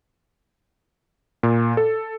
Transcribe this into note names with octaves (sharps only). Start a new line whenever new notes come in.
A#2
A4